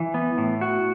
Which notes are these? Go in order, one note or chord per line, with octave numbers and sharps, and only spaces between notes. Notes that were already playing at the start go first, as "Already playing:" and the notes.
Already playing: E3
B3
A2
F#4